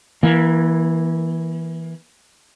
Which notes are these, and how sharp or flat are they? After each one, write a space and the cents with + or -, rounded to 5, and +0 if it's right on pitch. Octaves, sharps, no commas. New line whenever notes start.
E3 -5 A#3 +30